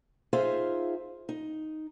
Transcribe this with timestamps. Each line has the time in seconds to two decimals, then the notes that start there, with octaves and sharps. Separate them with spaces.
0.33 D#4 F4 G#4 C5 E5 F5
1.29 D#4